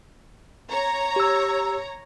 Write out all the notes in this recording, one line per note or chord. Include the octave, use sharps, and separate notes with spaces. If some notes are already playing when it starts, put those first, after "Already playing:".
C#5 A#5
G4 E6